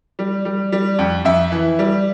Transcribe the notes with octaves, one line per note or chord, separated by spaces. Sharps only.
G3
G3
G3
F2
F2 E5
E3
G3